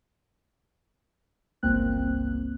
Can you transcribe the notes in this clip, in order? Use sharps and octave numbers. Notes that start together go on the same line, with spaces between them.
G1 C#2 A#3 C4 F#6